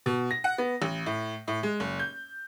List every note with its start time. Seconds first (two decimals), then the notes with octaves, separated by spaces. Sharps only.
0.06 B2
0.31 A#6
0.44 F#5
0.58 B3
0.82 A1
1.06 A2
1.48 A2
1.63 G#3
1.80 F#1
1.99 G6